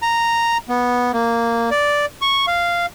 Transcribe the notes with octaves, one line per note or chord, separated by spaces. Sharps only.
A#5
B3
A#3
D5
C#6
F5